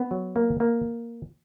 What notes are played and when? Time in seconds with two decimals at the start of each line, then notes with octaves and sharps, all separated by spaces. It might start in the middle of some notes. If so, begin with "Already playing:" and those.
Already playing: B3
0.11 F#3
0.36 A#3
0.60 A#3